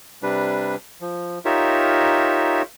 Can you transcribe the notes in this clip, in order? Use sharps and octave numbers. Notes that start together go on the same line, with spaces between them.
C3 G3 D4 B4
F3
D#4 F4 G4 A#4 C#5 E5